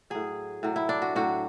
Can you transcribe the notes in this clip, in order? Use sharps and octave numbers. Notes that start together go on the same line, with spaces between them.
A2 F#3 G#4
A2 F#3
E4
D4
F#4
A2 F#3 F#4